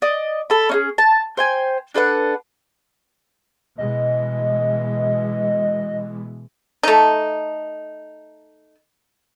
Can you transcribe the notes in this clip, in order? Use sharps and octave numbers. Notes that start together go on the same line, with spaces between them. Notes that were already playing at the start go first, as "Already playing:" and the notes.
D5 D#5
A4 B5
C#4 D#4 G#4
A5
C5 G5 G#5
D4 A4 B4 F#5
B2 E3 G#3 D#5
A3 D#4